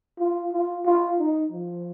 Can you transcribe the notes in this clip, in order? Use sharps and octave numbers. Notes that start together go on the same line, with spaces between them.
F4
F4
F4
D#4
F3